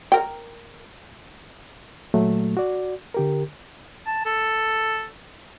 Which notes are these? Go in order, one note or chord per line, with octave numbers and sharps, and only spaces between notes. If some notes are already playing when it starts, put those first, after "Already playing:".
A#4 G5
A#2 F#3 A3
F#4 D5
D3 G4 A#4
A5
A4